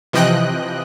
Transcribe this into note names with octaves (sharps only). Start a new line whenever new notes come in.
C3 E3 F3 D#5 G5 F#6